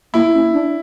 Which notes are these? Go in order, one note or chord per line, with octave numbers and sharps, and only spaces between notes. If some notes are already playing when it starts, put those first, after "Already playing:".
A#3 E4
C#4
D4